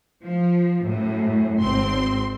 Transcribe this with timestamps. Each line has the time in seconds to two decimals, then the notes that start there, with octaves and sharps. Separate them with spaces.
0.24 F3
0.82 F#2 A2
1.61 G#1 C4 C6